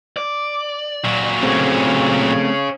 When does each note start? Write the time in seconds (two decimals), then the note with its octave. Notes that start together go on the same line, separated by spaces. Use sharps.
0.17 D5
1.05 A#2 F#3
1.43 A3 C4 C#4 G#4